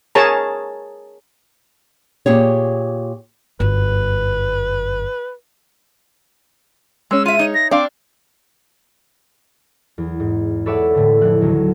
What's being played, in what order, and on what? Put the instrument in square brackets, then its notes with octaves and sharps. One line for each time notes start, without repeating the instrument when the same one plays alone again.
[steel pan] G#4 A#4 C#5 A5 A#5
[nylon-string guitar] A#2 G4 G#4 C#5
[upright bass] G1 F#2 [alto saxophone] B4
[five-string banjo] G#3 C#4 [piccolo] E6
[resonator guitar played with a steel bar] F4 E5 [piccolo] D#7
[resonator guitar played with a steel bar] D#4 C#5
[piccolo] A#6
[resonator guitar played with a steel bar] C4 [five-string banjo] D4 F5 [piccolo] D6
[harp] E2
G#2
A4 B4 C#5 D5 E5 F#5
A2 D3
F1 E4 F#6
D2 D#3 F#3